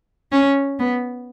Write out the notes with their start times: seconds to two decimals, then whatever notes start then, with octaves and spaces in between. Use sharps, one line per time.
0.32 C#4
0.79 B3